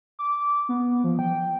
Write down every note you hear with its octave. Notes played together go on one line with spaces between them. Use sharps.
D6
B3
F3
G5